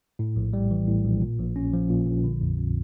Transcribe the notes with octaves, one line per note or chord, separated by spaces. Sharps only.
A2
A#1
G3
E3
A2
A#1
A#2
A#1
C#4
F3
A#2
A#1
D3
F2
F2